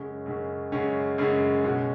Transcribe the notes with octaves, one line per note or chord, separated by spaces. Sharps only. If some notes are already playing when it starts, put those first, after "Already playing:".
Already playing: F#2 C#3 G#3 C#4
F#2 C#3 G#3 C#4
F#2 C#3 G#3 C#4
F#2 C#3 G#3 C#4
B2 G#3 C#4 F#4